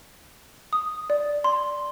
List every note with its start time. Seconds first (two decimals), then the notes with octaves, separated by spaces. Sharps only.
0.73 D#6
1.10 D5
1.44 C6